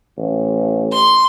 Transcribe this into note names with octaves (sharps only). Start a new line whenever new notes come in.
A1
C6